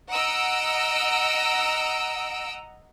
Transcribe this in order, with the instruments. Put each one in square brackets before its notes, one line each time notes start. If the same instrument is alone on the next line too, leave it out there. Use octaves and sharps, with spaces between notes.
[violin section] D#5 F#5 A#5 E6 D7